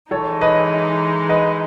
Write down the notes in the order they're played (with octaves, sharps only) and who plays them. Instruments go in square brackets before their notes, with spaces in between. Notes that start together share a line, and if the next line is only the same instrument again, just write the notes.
[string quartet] E3 G#3 D#4 [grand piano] A4 C#5
[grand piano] B4 D#5
B4 D#5